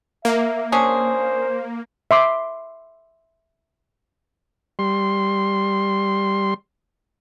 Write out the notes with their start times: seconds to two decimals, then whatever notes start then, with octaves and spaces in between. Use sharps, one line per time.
0.25 A#3 E5
0.72 C#4 D4 G#4 C5
2.11 E5 C6 D6
4.79 G3 C6